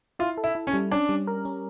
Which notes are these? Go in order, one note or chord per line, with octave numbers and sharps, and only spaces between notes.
E4 F4
A4
E4
E4
C#4
G3
C#4 D4
G3
A#4
C#4